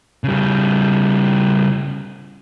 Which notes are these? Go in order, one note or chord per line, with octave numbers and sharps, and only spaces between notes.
C#3 G3